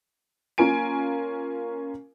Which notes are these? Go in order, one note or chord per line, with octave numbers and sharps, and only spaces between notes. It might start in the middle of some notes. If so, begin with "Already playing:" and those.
A#3 C#4 F4 A#4 G#5 D7